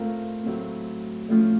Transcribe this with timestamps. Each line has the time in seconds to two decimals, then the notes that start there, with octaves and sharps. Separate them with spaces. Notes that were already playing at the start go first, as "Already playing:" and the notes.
Already playing: A2 A3 C4 F4 A#4
0.46 A2 F#3 C4
1.29 A2 F3 A3 C#4 F4